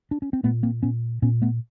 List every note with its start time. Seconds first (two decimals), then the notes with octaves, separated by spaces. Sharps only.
0.11 D4
0.22 C#4
0.33 C4
0.43 A#2 A3 B3
0.63 A#3 C4
0.83 A#2 B3 C#4
1.22 A#2 B3 C#4
1.42 A3 B3